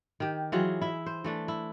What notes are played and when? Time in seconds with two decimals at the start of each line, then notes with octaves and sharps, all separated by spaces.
0.20 D#3 G4
0.52 E3 F#3 F4 G#4
0.81 E4 E5
1.06 C5
1.24 E3 A3 D4
1.48 E4